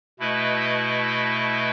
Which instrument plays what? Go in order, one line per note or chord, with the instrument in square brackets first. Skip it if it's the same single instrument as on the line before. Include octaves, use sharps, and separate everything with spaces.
[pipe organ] B2 A3 E4 B4 D#5